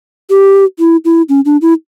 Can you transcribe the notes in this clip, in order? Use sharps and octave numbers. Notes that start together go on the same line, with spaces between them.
G4
E4
E4
C#4
D4
E4